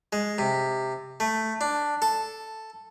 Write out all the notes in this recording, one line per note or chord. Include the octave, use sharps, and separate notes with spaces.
G#3
C3
A3
D4
A4